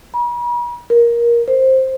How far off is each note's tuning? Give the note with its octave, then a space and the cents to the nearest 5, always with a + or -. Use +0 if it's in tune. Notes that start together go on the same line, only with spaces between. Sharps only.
B5 -45
A#4 +15
C5 +10